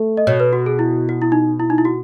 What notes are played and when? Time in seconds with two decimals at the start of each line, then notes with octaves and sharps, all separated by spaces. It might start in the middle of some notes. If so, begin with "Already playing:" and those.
Already playing: A3
0.17 D#5
0.27 B2 C#5
0.40 B4
0.53 F#4
0.66 G#4
0.79 E4
1.09 F#4
1.22 E4
1.32 D#4
1.60 E4
1.70 D#4
1.78 E4
1.85 F#4